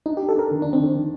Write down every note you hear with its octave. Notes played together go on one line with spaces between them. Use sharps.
D4 D#4
G4
D4
A4
D4 A#4
D#3
D4
D#3
C4
D#3
D#3